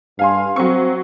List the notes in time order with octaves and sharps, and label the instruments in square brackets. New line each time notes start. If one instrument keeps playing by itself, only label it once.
[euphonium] G2 [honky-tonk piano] F5 G#5 C6
[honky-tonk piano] F#3 C#6 [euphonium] C4